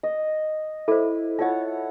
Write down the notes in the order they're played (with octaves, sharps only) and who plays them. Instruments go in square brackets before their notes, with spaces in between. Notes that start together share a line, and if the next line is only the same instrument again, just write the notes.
[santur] D#5
[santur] E4 [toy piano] A4 C5
[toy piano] F4 D#5 [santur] A4 C#5 F#5